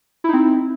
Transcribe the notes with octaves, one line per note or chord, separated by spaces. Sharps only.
C4 D#4 E4